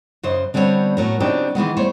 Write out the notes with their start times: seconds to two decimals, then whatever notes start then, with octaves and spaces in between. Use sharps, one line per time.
0.23 F#2 C#3 C5 D#5
0.54 D3 G3 B3 C4 A4 C#5
0.97 A2 F#3 A#4
1.20 C#3 F#3 C4 D4 D#4 G4
1.55 D#3 E3 G#3 B3
1.77 G3 A3 C5 C#5